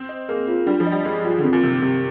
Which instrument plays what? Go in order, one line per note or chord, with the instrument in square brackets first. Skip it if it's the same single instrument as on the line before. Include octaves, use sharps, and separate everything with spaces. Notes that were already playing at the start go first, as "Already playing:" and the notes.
Already playing: [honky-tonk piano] C4
[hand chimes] D#5
[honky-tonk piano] A#3 [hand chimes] G#4
[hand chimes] F4
[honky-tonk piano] G3 [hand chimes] D4
[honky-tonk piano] F3
[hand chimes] D#5
[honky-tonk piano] G3
[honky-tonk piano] G#3 [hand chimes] G#4
[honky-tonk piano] G3 [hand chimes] F4
[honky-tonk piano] D3
[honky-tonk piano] D#3 [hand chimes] C4
[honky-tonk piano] A#2
[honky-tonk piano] C3 [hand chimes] C4
[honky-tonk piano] D#3
[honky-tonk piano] C3 [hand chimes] G4